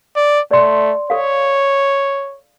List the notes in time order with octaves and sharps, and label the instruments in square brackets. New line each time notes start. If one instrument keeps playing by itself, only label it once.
[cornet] D5
[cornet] A3 [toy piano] D5 C6
[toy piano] A4 F5 [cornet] C#5